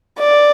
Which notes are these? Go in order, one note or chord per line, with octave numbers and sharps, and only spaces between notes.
D5